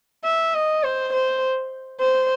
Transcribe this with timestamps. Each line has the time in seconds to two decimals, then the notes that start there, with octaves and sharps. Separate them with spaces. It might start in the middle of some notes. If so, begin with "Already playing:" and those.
0.24 E5
0.55 D#5
0.84 C5
1.13 C5
2.00 C5